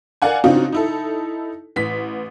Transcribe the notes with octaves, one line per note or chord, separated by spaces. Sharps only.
A#4 D5 F5 F#5 G#5
C#3 C4 D4 D#4 F4 F#4
D#4 E4 A4
A1 B6